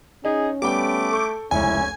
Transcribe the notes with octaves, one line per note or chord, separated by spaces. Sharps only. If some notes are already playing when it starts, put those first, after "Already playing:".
C#4 D#4 G#4
G3 A3 B3 G5 D6
A4 C#6 G6
F1 C#2 C#4 E4 G#5